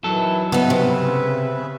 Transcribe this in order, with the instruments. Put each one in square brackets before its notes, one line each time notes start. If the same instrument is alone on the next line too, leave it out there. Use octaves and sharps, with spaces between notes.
[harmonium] D#3 E3 E4 [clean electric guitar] F#3 A4
[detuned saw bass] C#3 [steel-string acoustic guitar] B3 D#4 [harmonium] B4 E5
[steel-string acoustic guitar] C3